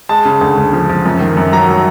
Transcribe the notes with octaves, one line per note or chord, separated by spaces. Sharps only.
G#3 A5
C#3
D2
D2
F3
F3
F#2
D#3
F#2
F#3 A#5
F#3